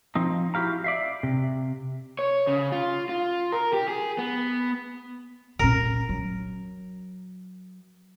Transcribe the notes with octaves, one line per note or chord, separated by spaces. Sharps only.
F3 C4 D#4
E4 F#4 G4 F5 A#5
D5 E5 F5
C3
C#5
C#3
F4
F4
A#4
G4
G#4
B3
A#2 C#4 A#4
F#3